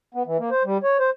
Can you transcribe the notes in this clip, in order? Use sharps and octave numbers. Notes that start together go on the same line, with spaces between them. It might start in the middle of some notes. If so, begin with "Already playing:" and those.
B3
E3
A#3
C5
G3
C#5
C5